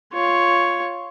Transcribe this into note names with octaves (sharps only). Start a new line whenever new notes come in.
F4 C#5